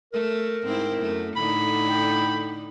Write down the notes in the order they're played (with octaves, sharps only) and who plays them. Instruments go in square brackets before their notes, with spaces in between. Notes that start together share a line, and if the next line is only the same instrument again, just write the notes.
[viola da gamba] A3 [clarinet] A#4
[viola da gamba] G#2 C4 E4
F#2 A3
[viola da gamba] A2 D3 D#4 [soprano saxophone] B5
[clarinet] G5